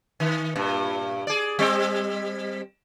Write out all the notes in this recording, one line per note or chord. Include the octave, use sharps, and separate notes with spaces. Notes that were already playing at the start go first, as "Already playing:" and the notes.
D#3
G2 A#2
G#4 D5
G3 C4